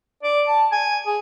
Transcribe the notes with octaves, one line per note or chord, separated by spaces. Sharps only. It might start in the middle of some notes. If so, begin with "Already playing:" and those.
D5
A5
G#5
G#4